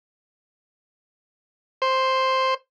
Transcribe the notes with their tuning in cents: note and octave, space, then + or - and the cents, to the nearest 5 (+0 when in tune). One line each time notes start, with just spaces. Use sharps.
C5 +5